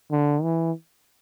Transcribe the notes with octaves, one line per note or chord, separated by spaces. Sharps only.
D3
E3